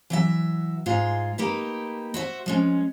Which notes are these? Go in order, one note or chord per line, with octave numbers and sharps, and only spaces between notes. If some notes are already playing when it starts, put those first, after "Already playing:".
E3 F#3 E5
G#2 G#3 F4
A#3 D#4 G4 B4
F#4 C5 D#5 E5
F3 G#3 C#4